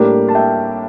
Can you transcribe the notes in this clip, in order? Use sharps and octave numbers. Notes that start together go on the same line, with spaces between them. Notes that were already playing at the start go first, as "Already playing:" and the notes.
Already playing: A2 G3 A#3 D4 G4 A#4
A5
E5 G5